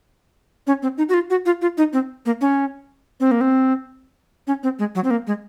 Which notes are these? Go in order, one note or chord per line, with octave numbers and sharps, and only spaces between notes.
C#4
C4
D#4
F#4
F4
F#4
F4
F4
D#4
C4
A#3
C#4
C4
A#3
C4
C#4
C4
G#3
F#3
C4
A#3
G#3